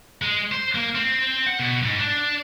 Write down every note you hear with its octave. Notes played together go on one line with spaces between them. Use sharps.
G#3
C5
A#3
C4
F#5
B2
G#2
D4